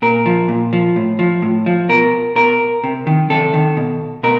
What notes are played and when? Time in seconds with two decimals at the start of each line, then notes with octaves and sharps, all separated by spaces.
0.02 A#2 A#4
0.26 F3
0.48 A#2
0.73 F3
0.96 A2
1.19 F3
1.42 A2
1.66 F3
1.89 B2 A#4
2.36 B2 A#4
2.84 C3
3.07 D#3
3.30 C3 A4
3.54 D#3
3.77 B2
4.23 B2 A#4